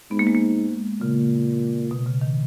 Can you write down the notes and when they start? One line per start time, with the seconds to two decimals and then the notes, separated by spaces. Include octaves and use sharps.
0.11 G#2 B3
0.19 A#3
0.27 G#3
0.35 A#3
1.01 A#2 C#3
1.91 B2
2.06 C#3
2.21 D#3